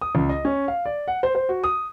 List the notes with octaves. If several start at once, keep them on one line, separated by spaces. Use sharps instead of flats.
D#6
C#2
D#5
C#4
F5
D5
F#5
C5
C5
F#4
D#6